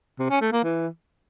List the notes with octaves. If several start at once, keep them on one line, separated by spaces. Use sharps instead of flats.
C3
C#4
A3
A#3
E3